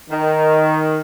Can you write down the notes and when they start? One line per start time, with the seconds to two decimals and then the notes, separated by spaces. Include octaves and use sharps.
0.10 D#3